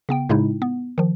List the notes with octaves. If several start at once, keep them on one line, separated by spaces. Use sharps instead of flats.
C#3 B3 G5
A2 C#3 G#3 D#4 E4
B3
D#3 F3